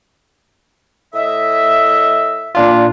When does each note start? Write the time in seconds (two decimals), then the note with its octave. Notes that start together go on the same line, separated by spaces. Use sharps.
1.14 A2 D#5 E5
2.55 A#2 D4 F4